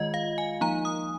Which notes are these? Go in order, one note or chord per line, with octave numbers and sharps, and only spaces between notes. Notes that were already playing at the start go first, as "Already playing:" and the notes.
Already playing: D#3 G#3 F4 D#5
F5
G#5
F3 A#3 D#4 A#5
D#6